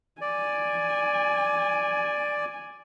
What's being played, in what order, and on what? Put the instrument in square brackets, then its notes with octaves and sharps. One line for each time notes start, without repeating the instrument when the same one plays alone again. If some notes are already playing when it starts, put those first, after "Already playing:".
[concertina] D5 [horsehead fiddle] G#5